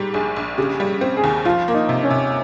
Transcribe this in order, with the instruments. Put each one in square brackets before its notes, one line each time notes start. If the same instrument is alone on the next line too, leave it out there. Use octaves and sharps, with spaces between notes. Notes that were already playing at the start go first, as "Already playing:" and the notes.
Already playing: [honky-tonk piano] G#2 G3 [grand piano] G4
[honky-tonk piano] A#1 [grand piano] G#4
[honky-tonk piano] A#1
[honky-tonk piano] C#3 [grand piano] G4
[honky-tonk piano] G3
C4
[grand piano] G#4
[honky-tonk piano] D#2
[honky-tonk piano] F3 [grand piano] F4
[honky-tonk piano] A#3
[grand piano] D#4
[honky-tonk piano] C3
[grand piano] C#4
[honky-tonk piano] C3